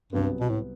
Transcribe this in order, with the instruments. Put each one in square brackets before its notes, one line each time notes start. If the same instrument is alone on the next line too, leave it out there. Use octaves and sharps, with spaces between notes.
[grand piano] C2 C3 F#3 B3 [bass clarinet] G2
[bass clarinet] B2
A2